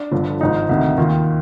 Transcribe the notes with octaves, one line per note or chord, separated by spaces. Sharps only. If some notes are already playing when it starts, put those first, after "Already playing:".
Already playing: D4
G1 G2 D3 F3
G#1 G#2 F3 D#4
D2 C3 D#3
D#2 D#3 F4